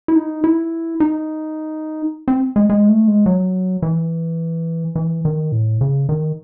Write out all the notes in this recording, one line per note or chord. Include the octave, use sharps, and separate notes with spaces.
E4
D#4
E4
D#4
C4
G#3
G#3
A3
G#3
F#3
E3
E3
D#3
A2
C#3
D#3